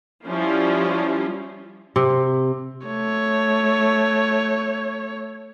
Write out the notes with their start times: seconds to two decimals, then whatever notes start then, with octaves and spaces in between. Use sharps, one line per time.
0.25 F3 G3 C#4 E4 F4
1.96 C3
2.87 A3 C#5